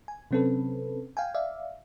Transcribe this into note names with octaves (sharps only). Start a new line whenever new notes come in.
G#5
C3 F#3 C4 C#4 A4 B4
F5 G5 G#5
D5 E5 F5